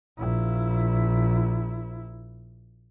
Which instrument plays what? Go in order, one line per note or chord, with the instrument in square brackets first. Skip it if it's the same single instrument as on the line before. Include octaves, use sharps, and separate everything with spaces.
[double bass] A#1 E4